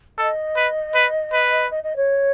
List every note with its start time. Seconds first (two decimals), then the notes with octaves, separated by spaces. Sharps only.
0.18 A4 D#5
0.56 B4
0.95 B4
1.33 B4
1.70 D#5
1.83 D#5
1.96 C#5